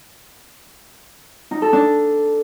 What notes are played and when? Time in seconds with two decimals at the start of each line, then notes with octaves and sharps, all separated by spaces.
1.51 D#4
1.62 A4
1.73 D4